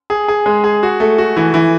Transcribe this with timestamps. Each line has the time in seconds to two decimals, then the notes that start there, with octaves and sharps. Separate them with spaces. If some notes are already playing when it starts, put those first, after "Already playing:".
0.10 G#4
0.28 G#4
0.46 G#3
0.64 G#4
0.83 F#4
1.00 A3
1.18 F#4
1.37 E3
1.54 E3